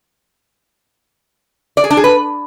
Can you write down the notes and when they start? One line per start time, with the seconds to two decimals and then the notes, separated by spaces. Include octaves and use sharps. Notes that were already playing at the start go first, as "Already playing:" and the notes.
1.77 D5
1.84 G#4
1.90 D4
1.97 G#4
2.04 B4